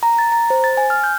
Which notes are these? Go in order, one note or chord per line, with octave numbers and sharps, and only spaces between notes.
A#5
A6
A#5
C5
A6
G#5
F6
G6